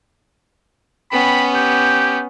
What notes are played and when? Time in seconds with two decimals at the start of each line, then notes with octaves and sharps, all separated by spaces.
1.12 B3 C#4 G5 B5
1.55 G4 G6